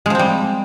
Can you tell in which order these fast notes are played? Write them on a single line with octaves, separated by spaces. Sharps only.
G#3 F3 C4 G3